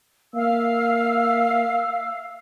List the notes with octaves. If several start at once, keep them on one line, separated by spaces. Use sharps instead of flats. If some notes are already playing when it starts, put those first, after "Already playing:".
A#3 E5 F5 E6